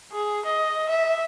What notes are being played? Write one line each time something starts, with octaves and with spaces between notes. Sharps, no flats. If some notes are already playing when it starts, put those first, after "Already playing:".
G#4
D#5
E5